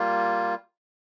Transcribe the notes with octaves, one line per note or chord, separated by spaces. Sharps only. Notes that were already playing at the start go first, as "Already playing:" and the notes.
Already playing: G3 A#3 F4